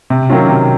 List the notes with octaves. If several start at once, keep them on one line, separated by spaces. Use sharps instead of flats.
C3
D#3 F#3 C#4 F4
C3